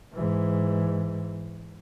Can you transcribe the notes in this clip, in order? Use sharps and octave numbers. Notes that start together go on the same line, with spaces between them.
G#2 E3